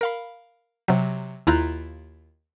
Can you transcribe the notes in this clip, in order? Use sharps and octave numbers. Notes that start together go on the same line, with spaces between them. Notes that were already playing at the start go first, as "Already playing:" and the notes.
A#4 F5 B5
C3 F#3
D#2 E4 F4 A#5 F#6 G6